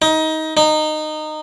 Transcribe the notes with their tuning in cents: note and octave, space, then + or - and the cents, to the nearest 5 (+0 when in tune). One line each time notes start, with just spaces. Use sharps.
D#4 +20
D#4 -20